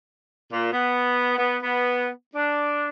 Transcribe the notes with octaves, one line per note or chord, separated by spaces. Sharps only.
A#2
B3
B3
B3
D4